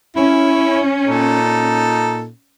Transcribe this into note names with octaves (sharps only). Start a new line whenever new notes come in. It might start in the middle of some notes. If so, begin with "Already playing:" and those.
C#4 E4
A#2 D#4 A4